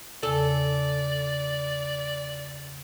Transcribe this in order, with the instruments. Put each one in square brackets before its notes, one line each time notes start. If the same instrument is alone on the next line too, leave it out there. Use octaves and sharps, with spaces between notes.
[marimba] E2 C#3 G#5 [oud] A4 [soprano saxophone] D5